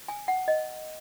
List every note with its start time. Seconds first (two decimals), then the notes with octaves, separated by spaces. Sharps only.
0.08 G#5
0.28 F#5
0.48 D#5